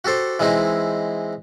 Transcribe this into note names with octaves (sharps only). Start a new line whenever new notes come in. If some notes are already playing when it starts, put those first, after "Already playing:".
F#4 G4 A4 C5
E3 G#3 C4 D#4 E4